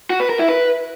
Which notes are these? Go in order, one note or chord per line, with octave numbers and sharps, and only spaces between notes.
F#4
B4
A#4
E4
B4